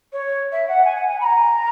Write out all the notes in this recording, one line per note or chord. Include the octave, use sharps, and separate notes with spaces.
C#5
E5
F#5
G#5
F#5
G#5
B5
A#5